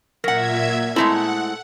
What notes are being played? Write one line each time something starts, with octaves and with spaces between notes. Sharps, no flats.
A#2 F#3 A#4 E5 F#5 G#6 A#6 B6
G#3 A3 C4 E4 A4 F#5 A5 A#5